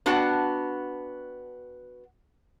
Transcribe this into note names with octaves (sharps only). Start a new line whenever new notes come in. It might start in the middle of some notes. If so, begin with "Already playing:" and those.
B3 D4 F#4 F#5 G5 A5